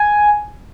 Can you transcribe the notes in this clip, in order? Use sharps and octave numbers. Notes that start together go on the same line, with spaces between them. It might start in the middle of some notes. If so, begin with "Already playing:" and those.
Already playing: G#5